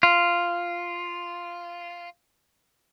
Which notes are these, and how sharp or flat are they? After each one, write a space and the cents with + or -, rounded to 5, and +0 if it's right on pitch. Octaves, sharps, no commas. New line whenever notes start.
F4 -5